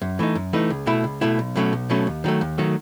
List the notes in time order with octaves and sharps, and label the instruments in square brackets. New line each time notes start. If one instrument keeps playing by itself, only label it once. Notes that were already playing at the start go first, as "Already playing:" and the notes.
[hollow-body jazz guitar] F#2
E3 A3 D#4
F#2
E3 A3 D#4
C#2
B2 A3 E4
C#2
B2 A3 E4
B1
B2 F#3 A3 C#4
B1
B2 F#3 A3 C#4
D#2
D#3 F#3 A3
D#2
D#3 F#3 A3